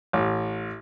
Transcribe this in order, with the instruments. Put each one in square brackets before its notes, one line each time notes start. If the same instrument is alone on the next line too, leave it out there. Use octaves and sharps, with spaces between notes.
[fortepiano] A1